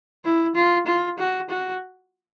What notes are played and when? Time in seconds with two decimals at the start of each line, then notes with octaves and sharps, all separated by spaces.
0.25 E4
0.55 F4
0.87 F4
1.18 F#4
1.50 F#4